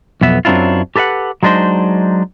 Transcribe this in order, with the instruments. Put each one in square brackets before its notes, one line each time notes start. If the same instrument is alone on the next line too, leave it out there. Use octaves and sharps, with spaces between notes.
[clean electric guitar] B1 F2 B3 E5
F#2 F#3 C4 D4 E4 F4
G4 A4 B4 E5 F#5
F#3 G#3 D4 D#4 C5